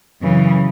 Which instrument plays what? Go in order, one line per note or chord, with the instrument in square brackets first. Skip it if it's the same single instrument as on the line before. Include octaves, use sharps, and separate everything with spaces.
[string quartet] F#2 C#3 E3